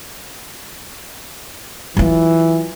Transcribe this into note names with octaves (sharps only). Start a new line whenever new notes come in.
E3 F#3 F4